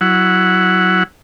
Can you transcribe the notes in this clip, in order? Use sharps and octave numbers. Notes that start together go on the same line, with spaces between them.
F#3 E4 F#5